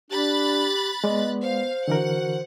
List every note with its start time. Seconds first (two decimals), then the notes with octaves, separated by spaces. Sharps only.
0.11 D4 G4 B5 F#6 A6
1.04 G#3 B3 D5 D#5
1.42 C5 F5
1.88 D3 E3 F#4 A#4 F#5